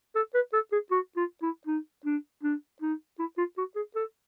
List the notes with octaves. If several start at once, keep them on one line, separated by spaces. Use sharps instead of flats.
A4
B4
A4
G#4
F#4
F4
E4
D#4
D4
D4
D#4
E4
F4
F#4
G#4
A4